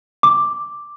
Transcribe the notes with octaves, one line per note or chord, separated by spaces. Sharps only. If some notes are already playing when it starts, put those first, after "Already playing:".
D6